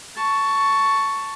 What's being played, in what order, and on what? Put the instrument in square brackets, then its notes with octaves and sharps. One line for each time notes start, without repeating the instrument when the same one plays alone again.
[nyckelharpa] A5 C#6